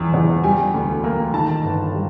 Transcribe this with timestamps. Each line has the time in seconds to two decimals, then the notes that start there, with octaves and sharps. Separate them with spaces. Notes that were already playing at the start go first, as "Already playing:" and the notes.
Already playing: E2
0.14 E2
0.44 G3 G#5
0.74 D2
1.04 A#3
1.34 D#3 A5
1.64 G1
1.94 G3